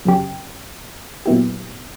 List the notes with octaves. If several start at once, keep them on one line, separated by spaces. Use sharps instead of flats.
F#2 C#3 F#3 C#4 G4
A#2 F#3 B3 E4 G4